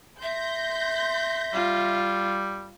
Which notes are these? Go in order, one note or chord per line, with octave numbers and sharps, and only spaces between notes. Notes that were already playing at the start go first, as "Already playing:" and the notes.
E5 C6 G6 A#6
G3 F4